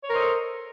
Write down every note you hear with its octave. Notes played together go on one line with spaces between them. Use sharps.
A4 A#4 C5 C#5 D#5